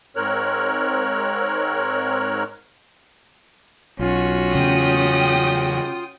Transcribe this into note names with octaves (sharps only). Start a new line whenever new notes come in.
G#2 C4 A#4 C#5 F6 F#6
B1 C#4 F4 F#4
E2 C#3 F#3 G5 D#6